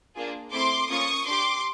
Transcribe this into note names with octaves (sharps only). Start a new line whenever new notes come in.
A#3 D4 F4 G#4
A3 C4 E4 C6 D6
A#3 C#4 F4 C#6 D#6
D4 G4 C6 D6